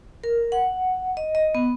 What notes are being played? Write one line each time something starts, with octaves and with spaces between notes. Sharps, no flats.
A#4
F#5
D#5
D#5
B3